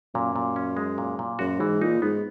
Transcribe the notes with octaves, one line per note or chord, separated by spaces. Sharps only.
F#2 A#2
A#2
C#4
G#3
A#2
A#2
F#2 F#4
G#2 E3
A#2 D#4
G#2 B3